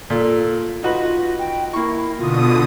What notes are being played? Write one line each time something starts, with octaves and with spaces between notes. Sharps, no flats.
A#2 A4
D#4 F4 F#4 B4
G5
A#3 E4 C#6
B2 D3 F4 D#6